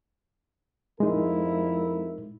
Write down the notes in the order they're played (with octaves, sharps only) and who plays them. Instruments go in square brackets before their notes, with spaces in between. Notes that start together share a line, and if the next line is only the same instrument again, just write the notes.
[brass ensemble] F2 E4 A#4 [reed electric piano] G#3 D#4